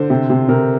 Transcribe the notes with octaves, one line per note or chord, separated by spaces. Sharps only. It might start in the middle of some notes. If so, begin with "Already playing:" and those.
Already playing: D3 C5
C3
C3
C3 A#4